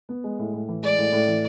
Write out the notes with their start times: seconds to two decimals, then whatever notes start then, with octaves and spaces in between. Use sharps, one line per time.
0.09 B3
0.24 G#3
0.39 A2
0.53 A2
0.68 E3
0.83 G#3 D5
0.98 A2
1.13 A2
1.28 E3